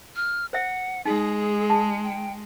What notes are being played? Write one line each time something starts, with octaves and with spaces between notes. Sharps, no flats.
F6
C5 E5 F#5
G#3 D#4 G#4
A5
G5